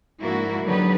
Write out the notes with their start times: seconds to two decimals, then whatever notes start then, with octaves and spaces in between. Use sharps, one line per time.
0.21 G#2 F3 A#3 D4 E4 F#4
0.64 D3 F#3 D#4 G4 B4